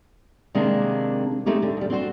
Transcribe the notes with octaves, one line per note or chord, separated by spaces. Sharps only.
C3 D#3 G#3 A#3 C4 D4
G#3 A3 C4 D#4 G4 C#5
D3
D#2 G3
C4 D4 F#4 C5